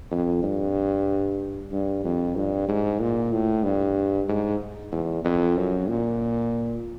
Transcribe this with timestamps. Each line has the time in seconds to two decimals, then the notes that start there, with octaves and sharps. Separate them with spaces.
0.11 F2
0.43 G2
1.72 G2
2.04 F2
2.36 G2
2.68 G#2
3.00 A#2
3.32 A2
3.64 G2
4.29 G#2
4.92 E2
5.25 F2
5.57 F#2
5.89 A#2